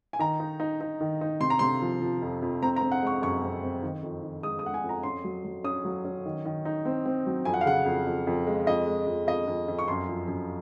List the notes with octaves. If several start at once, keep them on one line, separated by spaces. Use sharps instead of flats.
G#5
D#3 A#5
D#4
D#4
D#4
D#3
D#4
C3 C6
A#5
C3 C6
F3
F3
F2
F2
C4 A#5
A#5
C4
F#5
G#3 C#6
F#2 C#6
C4
C4
D#3
F2
D#3
G#3 D#6
D#6
G#3 F#5
G#5
F2
A#5
C#4 C6
F#3
F#3
C#4 D#6
F#3
C#4
D#3
D#3
D#4
C4
C4
F#3
F2 G#5
F#5
F5
C#3 F#5
F2
F2
F2
G#3
F2 D#5
G#3
F2
F2 D#5
F2
F2
C#6
F#2 C6
F3
F#2